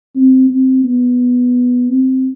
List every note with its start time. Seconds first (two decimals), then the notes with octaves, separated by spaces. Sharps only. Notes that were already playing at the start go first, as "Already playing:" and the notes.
0.16 C4
0.50 C4
0.84 B3
1.89 C4